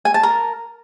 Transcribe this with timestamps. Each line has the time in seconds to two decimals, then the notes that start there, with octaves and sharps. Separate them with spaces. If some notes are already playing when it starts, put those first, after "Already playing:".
0.05 G#5
0.14 A5
0.23 A#4